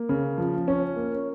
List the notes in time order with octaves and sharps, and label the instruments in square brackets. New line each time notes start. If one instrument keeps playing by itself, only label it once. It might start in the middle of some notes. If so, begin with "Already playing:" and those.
Already playing: [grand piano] A#3
C#3
F3
C#4
A#3